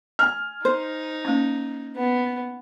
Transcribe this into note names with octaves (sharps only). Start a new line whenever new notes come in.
G#5 F6
D#4 C5
A#3 C#4
B3